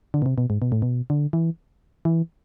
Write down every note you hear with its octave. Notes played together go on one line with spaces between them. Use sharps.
D3
B2
C3
B2
G#2
B2
A2
B2
D3
E3
E3